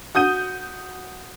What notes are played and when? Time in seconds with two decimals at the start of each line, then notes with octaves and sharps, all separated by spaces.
0.15 F#4 D#6 G6 D#7